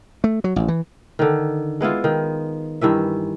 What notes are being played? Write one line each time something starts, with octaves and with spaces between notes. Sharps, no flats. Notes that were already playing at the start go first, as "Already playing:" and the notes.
A3
F#3
A1
E3
D3 D#3
G#3 B3 E4 F4
D#3
G2 D#3 E3 E5